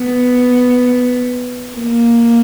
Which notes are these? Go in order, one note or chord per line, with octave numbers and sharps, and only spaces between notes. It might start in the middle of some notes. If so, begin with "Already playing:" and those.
Already playing: B3
A#3